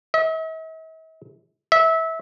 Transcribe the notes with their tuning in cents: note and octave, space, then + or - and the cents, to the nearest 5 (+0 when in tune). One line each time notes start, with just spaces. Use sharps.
E5 -45
E5 -20